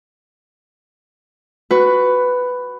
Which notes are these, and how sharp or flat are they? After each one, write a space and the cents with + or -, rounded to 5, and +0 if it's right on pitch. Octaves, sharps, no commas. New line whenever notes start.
F#4 +0 B4 +10